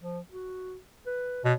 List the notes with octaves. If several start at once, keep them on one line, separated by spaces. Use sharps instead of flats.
F3
F#4
B4
B2 C#5